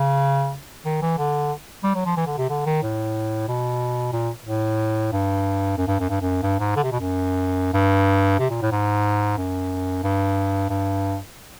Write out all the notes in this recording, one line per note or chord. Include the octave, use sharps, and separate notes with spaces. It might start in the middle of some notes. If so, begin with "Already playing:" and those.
Already playing: C#3
D#3
E3
D3
G3
F#3
F3
E3
D3
C3
D3
D#3
A2
B2
A#2
A2
G2
F#2
G2
F#2
G2
F#2
G2
G#2
D3
C3
B2
F#2
G2
C3
A#2
A2
G#2
F#2
G2
G2